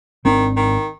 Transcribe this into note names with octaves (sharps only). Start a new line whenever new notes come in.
G#1 D#3 C4 D4
D#3